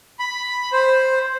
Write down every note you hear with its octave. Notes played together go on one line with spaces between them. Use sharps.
B5
C5